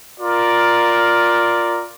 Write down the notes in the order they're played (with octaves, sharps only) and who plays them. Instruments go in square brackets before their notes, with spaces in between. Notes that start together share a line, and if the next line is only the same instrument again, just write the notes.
[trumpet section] F4 A#4 D5